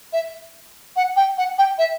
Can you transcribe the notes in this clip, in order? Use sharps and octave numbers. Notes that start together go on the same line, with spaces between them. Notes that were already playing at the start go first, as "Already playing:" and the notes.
E5
F#5
G5
F#5
G5
E5